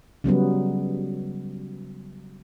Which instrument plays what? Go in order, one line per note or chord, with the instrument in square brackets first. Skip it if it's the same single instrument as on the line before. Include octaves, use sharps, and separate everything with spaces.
[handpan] C#3 F#3 G3 B3